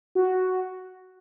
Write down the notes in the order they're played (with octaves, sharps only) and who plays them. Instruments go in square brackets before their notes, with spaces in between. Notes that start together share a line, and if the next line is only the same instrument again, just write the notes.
[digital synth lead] F#4